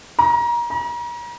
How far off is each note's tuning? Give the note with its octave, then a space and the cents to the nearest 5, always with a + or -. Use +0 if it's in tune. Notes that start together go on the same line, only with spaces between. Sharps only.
A#5 +30
A#5 +40